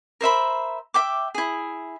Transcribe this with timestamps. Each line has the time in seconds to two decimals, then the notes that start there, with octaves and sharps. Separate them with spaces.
0.21 A#4 C5 E5 B5
0.94 E5 G5 D6
1.35 E4 G#4